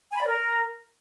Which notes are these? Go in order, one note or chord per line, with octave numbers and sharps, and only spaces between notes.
G#5
B5
D5
A#4